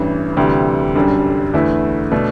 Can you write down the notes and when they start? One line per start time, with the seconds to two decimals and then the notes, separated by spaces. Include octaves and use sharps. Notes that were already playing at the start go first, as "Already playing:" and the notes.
Already playing: A1 G2 E3
0.37 D2 C3 E3 G3
0.95 G1 F#2 D3 G3
1.54 E2 D3 A3 E4 B4
2.11 B2 A3 D4